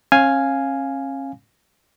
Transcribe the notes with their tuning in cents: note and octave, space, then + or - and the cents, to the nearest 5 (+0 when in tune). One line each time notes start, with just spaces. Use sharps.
C#4 -40 F5 +0 G#5 +0